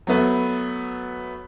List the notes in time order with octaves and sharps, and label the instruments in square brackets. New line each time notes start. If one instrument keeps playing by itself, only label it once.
[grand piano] F#3 A3 B3